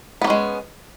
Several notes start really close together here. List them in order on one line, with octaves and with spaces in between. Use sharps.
B3 A#3 C#4 G#3